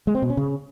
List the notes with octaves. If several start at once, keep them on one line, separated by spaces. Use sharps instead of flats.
G#3
C4
B2
C#4
C#3